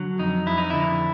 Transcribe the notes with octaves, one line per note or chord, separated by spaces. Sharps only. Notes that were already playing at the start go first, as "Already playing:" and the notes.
Already playing: D3 F#3
F2 D#4
F2 E4
D#4
D3 E4